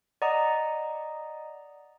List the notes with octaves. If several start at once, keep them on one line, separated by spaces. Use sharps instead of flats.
D5 D#5 F#5 A#5 D#6